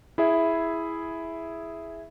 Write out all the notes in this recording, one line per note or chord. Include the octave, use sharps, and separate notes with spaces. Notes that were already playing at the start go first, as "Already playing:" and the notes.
E4 G#4 E5